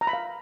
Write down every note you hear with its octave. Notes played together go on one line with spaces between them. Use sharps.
A#5
B5
F5